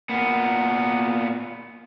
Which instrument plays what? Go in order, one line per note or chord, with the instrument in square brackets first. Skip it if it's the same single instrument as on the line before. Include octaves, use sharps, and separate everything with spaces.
[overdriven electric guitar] A#2 B3